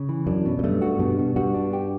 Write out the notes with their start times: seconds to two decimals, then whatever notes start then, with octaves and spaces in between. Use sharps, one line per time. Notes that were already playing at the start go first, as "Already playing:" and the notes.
Already playing: C#3
0.09 E3
0.27 F#2 D4
0.45 B2
0.59 F#2
0.64 G2 A3
0.82 F#4
0.99 G2 B2
1.19 B2
1.36 G2 F#4
1.54 D4
1.73 G4